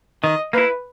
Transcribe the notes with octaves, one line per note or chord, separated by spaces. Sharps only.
D#3 D#5
A#3 E4 B4